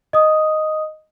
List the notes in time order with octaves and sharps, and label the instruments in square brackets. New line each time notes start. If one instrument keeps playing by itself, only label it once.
[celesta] D#5 D#6